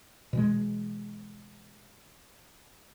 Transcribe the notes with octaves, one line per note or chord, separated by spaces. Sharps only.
B2 E3 G#3